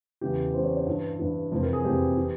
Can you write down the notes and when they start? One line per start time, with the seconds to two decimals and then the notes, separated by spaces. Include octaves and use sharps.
0.21 E2 C#3 E3 G4
0.54 E2 C#3 E3 C5
0.65 C#5
0.77 C#5
0.86 G2 E3
1.19 G2 E3
1.52 F2 C3 E3 C5
1.63 A#4
1.73 G#4
1.84 F2 C3 E3 G4
2.17 E3